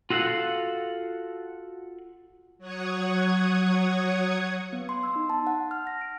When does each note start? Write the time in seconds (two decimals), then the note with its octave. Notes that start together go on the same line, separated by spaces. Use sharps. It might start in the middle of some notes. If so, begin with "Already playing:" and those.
0.10 F4 F#4 A4 F5 F#5
2.58 F#3 C#5 F#5 C#6 D#6 G#6
4.73 B3
4.89 C6
5.03 E6
5.16 D#4
5.30 A5
5.47 F#5
5.71 F6
5.87 A#6
6.01 D7